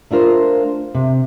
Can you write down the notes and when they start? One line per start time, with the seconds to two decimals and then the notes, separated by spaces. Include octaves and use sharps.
0.11 A3 D4 F4 A#4 C5
0.95 C3